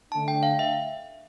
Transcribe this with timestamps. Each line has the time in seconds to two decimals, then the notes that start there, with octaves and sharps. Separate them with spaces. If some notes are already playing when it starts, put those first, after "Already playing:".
0.12 D3 A3 D4 A5
0.28 G5
0.43 F5
0.59 E5